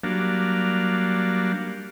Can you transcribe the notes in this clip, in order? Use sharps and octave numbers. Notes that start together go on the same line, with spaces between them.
F#3 G3 A#3 D4 F5